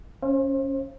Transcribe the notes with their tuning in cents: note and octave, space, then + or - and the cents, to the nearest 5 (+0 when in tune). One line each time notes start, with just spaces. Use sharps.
C#4 +0 C5 +35 F5 -40